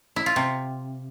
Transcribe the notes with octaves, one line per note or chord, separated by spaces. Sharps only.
E4
F4
C3